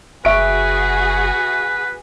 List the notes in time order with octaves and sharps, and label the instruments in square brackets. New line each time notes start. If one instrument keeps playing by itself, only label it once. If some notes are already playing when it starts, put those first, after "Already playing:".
[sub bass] F#1 [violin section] F#4 G#4 [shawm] B4 [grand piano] E5 C#6 D7